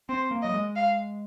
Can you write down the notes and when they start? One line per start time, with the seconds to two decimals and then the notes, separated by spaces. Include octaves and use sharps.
0.09 C4 C5
0.31 A#3
0.42 F#3 D#5
0.54 G#3
0.76 F5